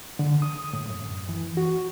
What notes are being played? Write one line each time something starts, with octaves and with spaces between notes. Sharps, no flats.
D3
D#6
A2
F#2
E3
F#4